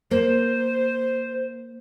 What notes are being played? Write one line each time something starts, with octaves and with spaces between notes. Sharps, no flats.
A#3 C5